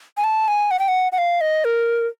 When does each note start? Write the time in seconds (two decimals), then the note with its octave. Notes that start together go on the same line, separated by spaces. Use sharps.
0.17 G#5
0.24 A5
0.48 G#5
0.71 F#5
0.79 G5
0.88 F#5
1.12 F#5
1.18 F5
1.41 D#5
1.65 A#4